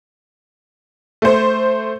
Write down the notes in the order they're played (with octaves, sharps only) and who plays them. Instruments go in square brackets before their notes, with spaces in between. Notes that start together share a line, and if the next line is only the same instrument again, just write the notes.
[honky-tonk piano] A3 C5